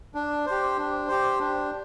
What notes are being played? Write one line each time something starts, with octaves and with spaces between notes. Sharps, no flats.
D4
G4 C5
D4
G4 C5
D4